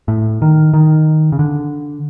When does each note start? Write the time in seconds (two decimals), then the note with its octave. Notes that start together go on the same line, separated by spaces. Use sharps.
0.08 A2
0.42 D#3
0.73 D#3
1.32 C#3
1.39 D3